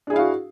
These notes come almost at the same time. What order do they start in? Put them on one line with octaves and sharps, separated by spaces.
D4 G#4 E4 F5 F#4